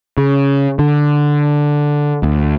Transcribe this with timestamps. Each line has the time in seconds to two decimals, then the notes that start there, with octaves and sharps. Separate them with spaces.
0.17 C#3
0.79 D3
2.23 D2